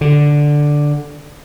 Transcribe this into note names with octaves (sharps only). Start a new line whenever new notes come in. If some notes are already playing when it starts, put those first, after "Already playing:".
D3